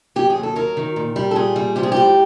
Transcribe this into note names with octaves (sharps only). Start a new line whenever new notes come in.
F#3 G4
G#4
D#2
A4
F#3 A#4
D#3
A#2
G3
A4
A#2 G#4
G3
F3 G4
G#4
A2 G4